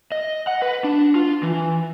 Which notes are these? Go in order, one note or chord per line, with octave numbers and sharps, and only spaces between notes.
D#5
F#5
B4
D4
F4
E3